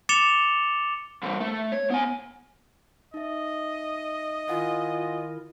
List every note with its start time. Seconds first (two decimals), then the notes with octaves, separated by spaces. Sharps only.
0.09 D6 A6 C#7 E7 F7 G7
1.23 E3 G3
1.40 A3
1.72 C#5
1.90 B3 G#5
3.14 D#4 D#5 E5
4.49 D#3 E4 F4 A#4 F5 F#5 G#5